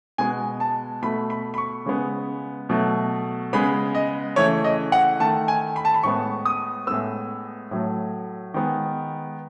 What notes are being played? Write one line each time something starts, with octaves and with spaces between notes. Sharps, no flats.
B2 G#3 B3 G#5
A5
B2 A3 B5
B5
B5
C#6
C#3 G#3 B3
B2 F#3 A3
C#3 G#3 B3 B5
D#5
C#3 E3 A3 C#5
D#5
F#5
D#3 A3 A5
G#5
B5
A5
B5
A2 G#3 B3 C#6
D#6
A2 G#3 B3 E6
A2 F#3 A3
D#3 G#3 B3